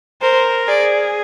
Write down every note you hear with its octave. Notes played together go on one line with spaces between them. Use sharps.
A#4 C5
G#4 D5